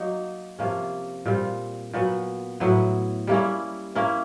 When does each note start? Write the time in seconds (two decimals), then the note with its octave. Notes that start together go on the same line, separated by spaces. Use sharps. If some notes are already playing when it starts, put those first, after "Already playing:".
Already playing: F#3 A#3 D#4
0.59 C3 F3 A#3 C#4
1.25 A#2 G3 C4 F4
1.93 A#2 F#3 B3
2.60 A2 F#3 B3 E4
3.27 G3 A#3 C#4 E4
3.95 A#3 C#4 E4